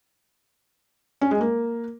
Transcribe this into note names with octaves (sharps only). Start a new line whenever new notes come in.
C#4
G#3
A#3